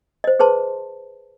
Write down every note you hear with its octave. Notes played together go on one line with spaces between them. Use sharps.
C5 D#5
G#4 B4 C5 A5 C6